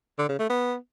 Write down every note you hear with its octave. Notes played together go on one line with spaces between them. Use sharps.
D3
C#3
A3
B3